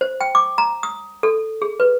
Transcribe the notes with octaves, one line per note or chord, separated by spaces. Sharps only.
C5
G5
D6
A#5
D#6
A4
G#4
B4